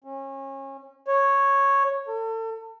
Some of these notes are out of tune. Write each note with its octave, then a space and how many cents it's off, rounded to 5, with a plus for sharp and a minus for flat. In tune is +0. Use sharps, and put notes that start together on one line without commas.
C#4 -30
C#5 -5
A4 +35